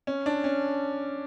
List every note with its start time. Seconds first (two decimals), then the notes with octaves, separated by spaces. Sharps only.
0.07 C#4
0.26 D4
0.44 C#4